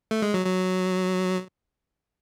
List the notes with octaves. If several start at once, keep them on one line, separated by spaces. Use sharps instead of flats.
A3
G#3
F#3
F#3